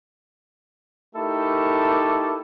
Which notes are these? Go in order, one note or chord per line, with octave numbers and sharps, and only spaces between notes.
A3 D#4 E4 G4 A4 A#4